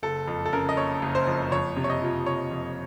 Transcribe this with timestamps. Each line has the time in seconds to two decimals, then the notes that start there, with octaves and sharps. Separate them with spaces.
0.03 F#1 A4
0.28 F2
0.45 A4
0.53 C#3 A#4
0.69 D#5
0.77 F#1 C#5
1.02 F#1
1.15 C5
1.27 F2
1.51 F2 C#5
1.77 C3
1.84 C#5
1.90 D#5
2.02 F3
2.26 F2 C#5
2.51 F2